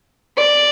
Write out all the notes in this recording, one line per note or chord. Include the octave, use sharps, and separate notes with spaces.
D5